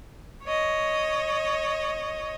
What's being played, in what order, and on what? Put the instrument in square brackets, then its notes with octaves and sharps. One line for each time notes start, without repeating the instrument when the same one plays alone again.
[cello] C#5 D#5